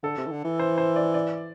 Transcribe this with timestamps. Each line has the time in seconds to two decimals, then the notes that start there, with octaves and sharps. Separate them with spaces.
0.03 D3 A4
0.18 C3
0.27 E3
0.31 D3
0.45 E3
0.59 C5
0.78 C5
0.96 D5
1.14 D5